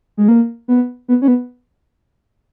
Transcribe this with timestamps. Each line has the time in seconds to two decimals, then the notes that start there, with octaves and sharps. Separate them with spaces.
0.17 G#3
0.28 A#3
0.68 B3
1.08 B3
1.22 C#4
1.28 B3